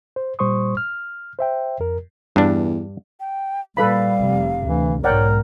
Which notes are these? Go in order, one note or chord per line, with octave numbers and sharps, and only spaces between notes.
C5
A#2 G3 C5 C6 C#6 D#6
F6
C5 E5 G5
F2 A#4
E2 G2 D4
G5
A#2 G3 A4 B4 F5 B5
F1 C3
D2 E3
B1 G#2 A#4 C#5 D5 F#5 G5